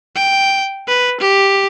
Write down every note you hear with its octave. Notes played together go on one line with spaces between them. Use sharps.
G5
B4
G4